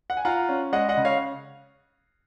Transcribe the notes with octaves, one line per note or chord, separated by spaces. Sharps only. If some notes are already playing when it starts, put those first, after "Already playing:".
F#5
G#5
F4 F#5 A#5
C#4
G#3 D#5 F#5
D#5 F#5
C#3
C#5 F5